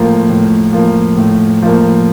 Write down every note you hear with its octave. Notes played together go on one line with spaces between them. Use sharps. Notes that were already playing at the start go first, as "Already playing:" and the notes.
Already playing: A2 F3 A#3
A2
F3 A#3
A2
F3 A#3